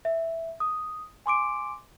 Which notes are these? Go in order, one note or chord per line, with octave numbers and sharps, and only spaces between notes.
E5
D#6
G#5 C6 D6 D7